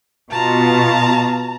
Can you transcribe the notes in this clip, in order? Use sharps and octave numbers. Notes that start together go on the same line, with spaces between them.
B2 F4 A5 A#5